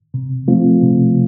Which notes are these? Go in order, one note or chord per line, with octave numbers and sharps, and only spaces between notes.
C3
F3 A3 C4 F4
C3